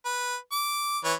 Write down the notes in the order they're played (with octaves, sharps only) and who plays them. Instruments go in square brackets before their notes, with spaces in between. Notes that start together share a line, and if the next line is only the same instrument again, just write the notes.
[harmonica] B4
D6
E3 B4 C#5